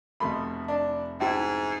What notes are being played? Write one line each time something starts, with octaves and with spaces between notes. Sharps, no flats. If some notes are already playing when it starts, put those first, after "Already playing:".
F1 F2 B2 A3 B5 C6
D4
G#2 C#4 D#4 E4 F#4